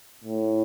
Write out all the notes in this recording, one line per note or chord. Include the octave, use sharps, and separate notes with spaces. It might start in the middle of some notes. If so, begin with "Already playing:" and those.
A2